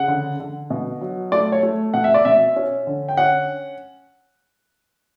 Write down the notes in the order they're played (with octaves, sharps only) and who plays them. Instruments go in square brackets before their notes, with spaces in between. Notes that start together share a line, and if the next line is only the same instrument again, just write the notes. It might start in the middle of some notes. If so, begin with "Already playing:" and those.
Already playing: [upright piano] C#3 F#5
D3
D3
B2
F#3
A3 D5
C#5
A3
B2 F#5
E5
D5
B2 E5
C#4
D3
G5
C#4 F#5